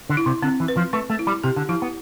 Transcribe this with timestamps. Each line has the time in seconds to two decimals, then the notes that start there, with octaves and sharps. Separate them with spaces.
0.09 D3
0.17 E4
0.26 C3
0.42 D3 C4
0.60 E3
0.68 B4
0.77 F3
0.93 A3 B4
1.10 A3
1.19 E4
1.27 G3
1.44 C3 G4
1.56 D3
1.69 F3 E4
1.82 B3